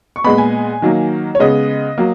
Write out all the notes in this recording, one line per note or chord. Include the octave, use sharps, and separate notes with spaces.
C#6
A#2 G#3 B3 B5
G#5
D#3 F#3 A#3
C#5
C#3 G#3 B3 D#5
F#3 A#3